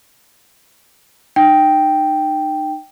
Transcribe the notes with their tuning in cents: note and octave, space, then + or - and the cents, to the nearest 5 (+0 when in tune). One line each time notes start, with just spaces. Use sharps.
D#4 -35 G5 +0